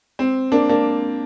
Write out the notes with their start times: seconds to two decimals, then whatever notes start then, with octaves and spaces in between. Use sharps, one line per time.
0.19 C4
0.52 A#3 D4
0.69 A#3 D4